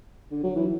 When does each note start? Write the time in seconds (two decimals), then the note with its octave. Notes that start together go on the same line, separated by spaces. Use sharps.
0.31 D3
0.44 F#3
0.56 E3